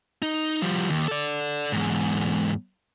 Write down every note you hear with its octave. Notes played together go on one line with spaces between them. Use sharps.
D#4
F3 G3
D#2
A4 D5
E2 G#2